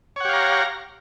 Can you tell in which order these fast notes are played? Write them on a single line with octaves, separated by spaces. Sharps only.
C#5 F#5 G4 F5 A#5